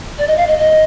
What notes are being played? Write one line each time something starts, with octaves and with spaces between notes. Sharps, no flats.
D5
D#5
F5
D#5
D#5